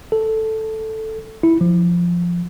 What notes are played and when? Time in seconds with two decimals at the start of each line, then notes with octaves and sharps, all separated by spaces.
0.12 A4
1.43 E4
1.61 F3